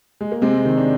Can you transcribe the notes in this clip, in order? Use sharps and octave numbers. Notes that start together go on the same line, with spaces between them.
G#3
A#3
C3 G#3 C4
D#3
D4